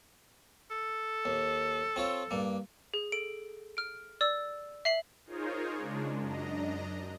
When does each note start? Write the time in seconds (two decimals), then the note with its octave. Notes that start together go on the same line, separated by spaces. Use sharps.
0.71 A4
1.25 D#2
1.96 C4 F4 C#5
2.31 G2 A#3
2.94 G#4
3.12 A4 D7
3.77 F6 D7
4.21 D5 E6
4.85 E5 C7 F#7
5.26 D#4 F4 G#4 A#4 C5 C#5
5.77 C#3 G#3 D4
6.20 F#2 D4 D#5 A#5